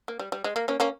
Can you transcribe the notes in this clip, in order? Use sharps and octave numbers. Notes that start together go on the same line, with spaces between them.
A#3
G3
G3
G#3
A#3
A#3 C#4
A#3 C#4